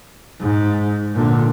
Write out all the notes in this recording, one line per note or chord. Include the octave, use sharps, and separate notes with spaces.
G#2
A#2 D3